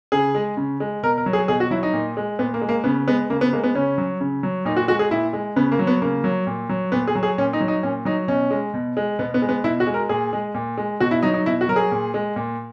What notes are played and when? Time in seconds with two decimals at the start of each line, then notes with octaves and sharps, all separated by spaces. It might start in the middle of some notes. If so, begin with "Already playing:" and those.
0.12 C#3 G#4
0.35 G#3
0.57 C#3
0.80 G#3
1.03 B2 A#4
1.18 A#4
1.26 F#3
1.33 G#4
1.48 B2 G#4
1.60 F#4
1.71 F#3 E4
1.83 D#4
1.93 A#2
2.17 G#3
2.39 A#2 B3
2.54 A#3
2.61 G#3
2.69 A#3
2.84 C#3 B3
3.07 G#3 B3
3.30 C#3 A#3
3.41 B3
3.53 G#3 A#3
3.63 B3
3.75 C#3 C#4
3.98 F#3
4.20 C#3
4.43 F#3
4.65 A#2 D#4
4.76 F#4
4.88 G#3 F#4
4.99 G#4
5.11 A#2 E4
5.33 G#3
5.56 C#3 B3
5.72 A#3
5.79 F#3
5.87 B3
6.02 C#3 A#3
6.24 F#3
6.47 A#2
6.69 F#3
6.92 A#2 B3
7.08 G#4
7.15 F#3
7.23 G#4
7.38 A#2 C#4
7.53 D#4
7.61 F#3
7.68 D#4
7.83 A#2 C#4
8.05 F#3 D#4
8.28 B2 C#4
8.51 G#3
8.74 B2
8.97 G#3
9.19 B2 B3
9.34 B3
9.42 G#3
9.49 B3
9.64 B2 E4
9.80 F#4
9.87 G#3
9.94 A#4
10.09 A#2 G#4
10.33 G#3
10.54 A#2
10.77 G#3
11.00 B2 F#4
11.11 E4
11.22 F#3 D#4
11.34 D#4
11.46 B2 E4
11.61 F#4
11.69 F#3 A#4
11.76 G#4
11.92 A#2
12.14 G#3
12.36 A#2